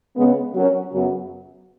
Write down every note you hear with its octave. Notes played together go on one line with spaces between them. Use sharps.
C#3 G#3 B3
F#3 C#4 F#4 A#4
F#2 C#3 F#3 B3 F#4